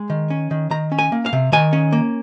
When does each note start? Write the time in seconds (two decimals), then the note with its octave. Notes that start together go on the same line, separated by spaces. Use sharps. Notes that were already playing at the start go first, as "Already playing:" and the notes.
Already playing: G#3
0.10 D#3
0.30 C#4
0.51 D#3
0.70 D#3 A#5
0.92 C#4
0.99 G#5
1.12 A#3
1.26 F5
1.33 C3
1.52 D#3 G#5
1.73 C#4
1.93 A#3